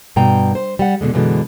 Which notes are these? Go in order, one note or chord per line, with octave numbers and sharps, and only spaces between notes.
G2 B2 G5 A#5
C5
G3 F#5
E2 B2 D3 G#3
F#2 B2 D3 E3 G#3